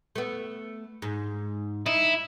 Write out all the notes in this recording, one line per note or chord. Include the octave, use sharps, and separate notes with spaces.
A3 B3
G#2
D#4 E4